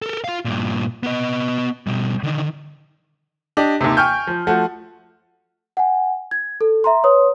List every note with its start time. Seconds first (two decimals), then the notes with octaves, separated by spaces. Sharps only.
0.02 A4 A#4
0.24 F4 F5
0.45 G2 A#2
1.03 B3 D#5
1.87 B2 G3
2.23 D3 D#3
3.57 D4 G4 D#5
3.81 D#2 C3
3.97 G5 G#5 C#6 F6 G6
4.27 F3
4.47 F3 A3 F#4
5.77 F#5 G#5
6.31 G#6
6.61 A4
6.84 E5 A#5 C6
7.04 B4 C#5 C6 D#6